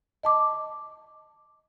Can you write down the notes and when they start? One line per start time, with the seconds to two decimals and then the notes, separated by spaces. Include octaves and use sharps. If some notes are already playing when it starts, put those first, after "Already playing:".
0.23 D#5 A5 D6